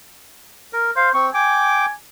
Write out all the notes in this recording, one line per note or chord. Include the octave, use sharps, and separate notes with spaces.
A#4
C5 F5
C4 C#6
G5 G#5 D6